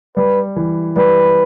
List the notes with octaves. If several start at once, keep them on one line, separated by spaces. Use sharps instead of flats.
G3 B4
E3
G3 B4